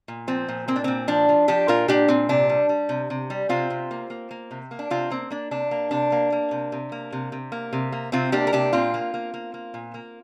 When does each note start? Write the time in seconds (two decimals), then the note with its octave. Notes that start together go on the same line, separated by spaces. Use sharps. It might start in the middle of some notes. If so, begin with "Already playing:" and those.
0.08 A#2
0.28 F3 C4
0.48 A#2
0.68 A#3 C4
0.76 D4
0.84 A#2 C4
1.08 F3 D4
1.29 F3
1.48 F3 D4 G4
1.68 A#2 F4 A#4
1.88 A#2 D4 G4
2.08 A#2 C4
2.29 C3 D4
2.49 G3
2.69 G3
2.89 C3
3.10 C3
3.30 G3
3.49 C3 C4 F4
3.70 C3
3.91 A#3
4.10 A#3
4.31 A#3
4.51 C3
4.71 A#3
4.79 D4
4.90 C3 C4 F4
5.10 A#3 C4
5.30 A#3 D4
5.51 C3 D4
5.71 A#3
5.91 C3 D4
6.12 A#3
6.32 A#3
6.51 C3
6.72 C3
6.92 A#3
7.12 C3
7.32 C3
7.52 A#3
7.73 C3
7.92 A#3
8.12 C3 C4 F4
8.32 A#3 D4 G4
8.47 A#4
8.53 C3 D4 G4
8.73 A#2 C4 F4
8.94 A#3
9.14 A#3
9.34 A#3
9.54 A#3
9.74 A#2
9.94 A#3